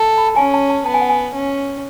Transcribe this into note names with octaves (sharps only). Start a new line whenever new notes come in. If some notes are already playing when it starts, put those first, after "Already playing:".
Already playing: A4
B5
A5
C#4 G#5
A5
A5
B3 A5
G#5
F#5
G#5
C#4